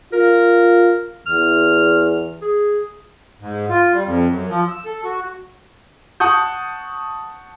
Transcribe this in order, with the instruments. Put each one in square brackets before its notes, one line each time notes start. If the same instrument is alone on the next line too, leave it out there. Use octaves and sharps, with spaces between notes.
[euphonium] F4 [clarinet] A#4
[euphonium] E2 [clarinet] F6
[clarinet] G#4
[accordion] G#2
F4
G3
F2
F#2
F3
E6
A4
F#4
[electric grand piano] F#5 A5 C#6 D#6 G6